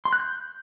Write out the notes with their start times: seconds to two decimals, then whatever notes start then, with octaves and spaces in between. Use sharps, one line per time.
0.05 C6
0.13 F#6
0.20 G6